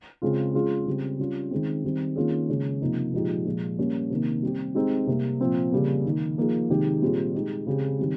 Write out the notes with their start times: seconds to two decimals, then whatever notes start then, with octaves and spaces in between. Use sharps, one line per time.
0.22 C#3 G#3 C4 F4 G#4
0.54 G#3 C#4 F4 G#4
0.86 C#3 G3 C4
1.20 G3 C#4 F4
1.51 D#3 G#3 C4
1.84 D#3 G3 C4
2.16 D#3 A#3 C#4 F4 G#4
2.49 C#3 G#3 C#4
2.81 C3 F3 A#3 D#4
3.13 A#2 F3 G#3 D#4 G4
3.45 A#2 F3 G#3
3.79 G3 A#3 C#4
4.10 C3 D#3 A#3
4.42 G3 C4 G4
4.75 G#3 C4 D#4 G4
5.07 C3 G3 A#3
5.41 A#2 F3 C4
5.72 C#3 G3 A#3
6.05 D#3 A#3 D#4
6.38 F3 A#3 D#4 G#4
6.70 C3 D#3 G#3 D#4 G4
7.01 A#2 G3 C4 F4 G#4
7.35 G#3 D#4 G4
7.67 C#3 G#3 C4 G4
7.99 D#3 G3 C4